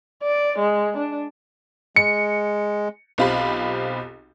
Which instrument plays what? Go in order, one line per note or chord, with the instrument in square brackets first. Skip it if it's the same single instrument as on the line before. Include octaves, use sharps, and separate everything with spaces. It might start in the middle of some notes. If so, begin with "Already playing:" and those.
[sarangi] D5
G#3
D4
[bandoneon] G#3 [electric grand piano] C#7
[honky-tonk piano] B1 C4 F4 G4 B5